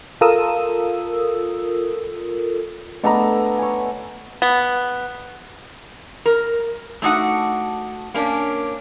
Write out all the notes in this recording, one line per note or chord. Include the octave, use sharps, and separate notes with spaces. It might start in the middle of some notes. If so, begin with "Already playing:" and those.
F4 A4 A#4 D#6 E6
A3 B3 D4 A4 D#5 A#5
C#5 G#5
B3
A#4
A3 D4 D#4 F#4 F#5
A#3 C#4 D4